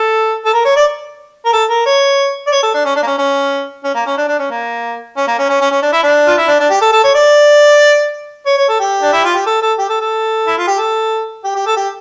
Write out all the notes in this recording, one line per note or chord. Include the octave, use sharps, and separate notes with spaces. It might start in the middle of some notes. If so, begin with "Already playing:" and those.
Already playing: A4
A4
A#4
C#5
D5
A#4
A4
A#4
C#5
D5
C#5
A4
D4
C#4
D4
A#3
C#4
C#4
C#4
A#3
C#4
D4
D4
C#4
A#3
C#4
A#3
C#4
C#4
C#4
C#4
D4
E4
D4
F4
E4
D4
D4
G4
A4
A4
C#5
D5
C#5
C#5
A4
G4
D4
E4
F4
G4
A4
A4
G4
A4
A4
E4
F4
G4
A4
G4
G4
A4
G4